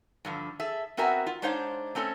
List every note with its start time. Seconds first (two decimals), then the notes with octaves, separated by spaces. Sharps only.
0.25 G2 D3 F3
0.60 G#4 A4 E5
0.97 B3 C4 F#4 A#4 E5 G#5
1.27 F4
1.42 G#3 D4 D#4 C5 C#5 F5
1.95 A3 C4 C#4 A4 C#5